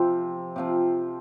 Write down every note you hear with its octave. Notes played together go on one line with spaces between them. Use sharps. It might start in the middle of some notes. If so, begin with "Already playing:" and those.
Already playing: C3 F3 C4
C3 F3 C4